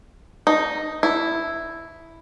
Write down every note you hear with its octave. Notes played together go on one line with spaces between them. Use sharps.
D#4
E4